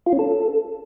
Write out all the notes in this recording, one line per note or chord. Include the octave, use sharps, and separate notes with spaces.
F4
C#4
A4